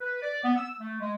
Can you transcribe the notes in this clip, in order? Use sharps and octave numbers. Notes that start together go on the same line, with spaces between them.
B4
D5
B3
E6
A3
G#3